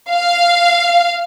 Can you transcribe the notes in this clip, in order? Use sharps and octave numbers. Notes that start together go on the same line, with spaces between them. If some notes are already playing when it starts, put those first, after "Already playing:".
F5